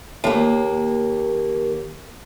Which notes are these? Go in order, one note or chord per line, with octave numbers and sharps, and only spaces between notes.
D#2 A#3